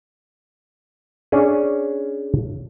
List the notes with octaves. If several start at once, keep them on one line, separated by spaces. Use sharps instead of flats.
C#4 D4 G#4